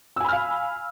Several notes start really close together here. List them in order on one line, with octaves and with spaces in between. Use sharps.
E6 G#5 B5 F6 F5